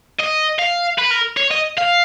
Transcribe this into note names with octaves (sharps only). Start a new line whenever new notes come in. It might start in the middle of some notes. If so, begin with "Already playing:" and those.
D#5
F5
B4
A#4
C#5
D#5
F5